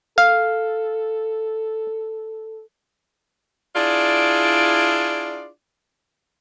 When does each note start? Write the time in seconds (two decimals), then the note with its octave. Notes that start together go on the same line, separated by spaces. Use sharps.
0.18 A4 F5
3.75 D4 E4 F4 G#4 D5